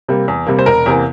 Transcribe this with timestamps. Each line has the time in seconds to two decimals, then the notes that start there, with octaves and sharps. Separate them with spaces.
0.08 C3 G3 A#3
0.28 E2
0.47 C3 G3 A#3
0.59 C5
0.66 E1 A#4
0.86 E2 C3 E3 A#3